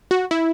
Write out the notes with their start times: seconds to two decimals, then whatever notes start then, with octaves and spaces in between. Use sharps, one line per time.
0.11 F#4
0.31 E4